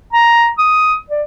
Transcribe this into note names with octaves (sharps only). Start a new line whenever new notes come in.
A#5
D#6
D5